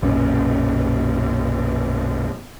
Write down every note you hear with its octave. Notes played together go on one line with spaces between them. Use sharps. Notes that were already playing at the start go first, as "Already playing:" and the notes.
B1 F#2 A#2 C#4